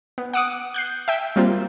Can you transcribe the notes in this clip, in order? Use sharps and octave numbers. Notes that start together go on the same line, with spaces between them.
B3
F#5 D6 D#6
F#6 G6 C7
E5 G5
G3 A#3 C4 F4